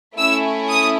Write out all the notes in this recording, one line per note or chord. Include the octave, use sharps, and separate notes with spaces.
A3 C#4 E4 E6
D#6